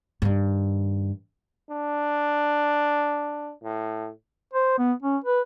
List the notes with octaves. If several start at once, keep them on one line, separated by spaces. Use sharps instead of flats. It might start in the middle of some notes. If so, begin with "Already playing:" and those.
G2 D#3
D4
A2
C5
B3
C#4
B4